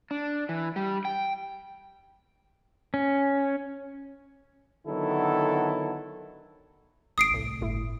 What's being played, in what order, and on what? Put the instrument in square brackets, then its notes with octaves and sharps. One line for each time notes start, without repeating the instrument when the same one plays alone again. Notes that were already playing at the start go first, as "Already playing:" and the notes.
[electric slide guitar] D4
E3
G3
G5
[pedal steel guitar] C#4
[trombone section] D3 D#3 F#3 B3 E4 A4
[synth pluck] G#1 [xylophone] D#6 C7 D7
[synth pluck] C2 A2
G1 A2 E4